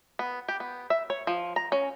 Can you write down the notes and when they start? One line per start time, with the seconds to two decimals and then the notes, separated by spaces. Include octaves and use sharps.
0.19 B3
0.48 G4
0.60 B3
0.90 E5
1.10 C#5
1.27 F3
1.56 A#5
1.72 C#4